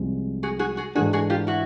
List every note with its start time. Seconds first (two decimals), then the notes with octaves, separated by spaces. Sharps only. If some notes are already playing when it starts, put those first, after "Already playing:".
Already playing: C2 C3 F3 G#3
0.43 F#4 G#4
0.59 F#4 G#4
0.77 F#4 G#4
0.95 G#2 E3 A3 D4 F#4 G#4
1.13 F#4 G#4
1.30 F4 G4
1.47 E4 F#4